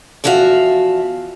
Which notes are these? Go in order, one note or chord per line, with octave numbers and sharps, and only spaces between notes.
E2 F3 F#4 E5 F5